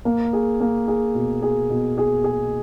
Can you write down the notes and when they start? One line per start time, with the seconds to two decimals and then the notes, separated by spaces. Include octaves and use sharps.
0.05 A#3
0.33 G#4
0.60 A#3
0.88 G#4
1.15 B2
1.42 G#4
1.70 B2
1.98 G#4
2.24 G#4